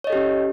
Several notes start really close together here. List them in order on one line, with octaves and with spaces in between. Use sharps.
C#5 D#5 A4 G4 C#4